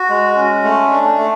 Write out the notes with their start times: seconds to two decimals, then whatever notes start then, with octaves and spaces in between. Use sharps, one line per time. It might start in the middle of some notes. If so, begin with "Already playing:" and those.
Already playing: F#4
0.10 G#3
0.36 C#4
0.64 A3
0.91 D4
1.18 A3